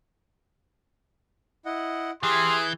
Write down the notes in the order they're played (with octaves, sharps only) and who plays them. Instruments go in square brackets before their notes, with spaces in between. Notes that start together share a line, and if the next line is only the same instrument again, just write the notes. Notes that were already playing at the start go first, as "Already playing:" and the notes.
[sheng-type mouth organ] E4 D#5 F#5
[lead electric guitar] E3 [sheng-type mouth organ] G4 F6 [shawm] G#4 [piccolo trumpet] C6